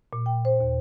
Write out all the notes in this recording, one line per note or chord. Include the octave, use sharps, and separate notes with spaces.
A#2
G5
C5
D#2